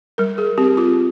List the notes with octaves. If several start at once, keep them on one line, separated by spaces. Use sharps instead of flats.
G3 A#4
G#4
C4 G4
F4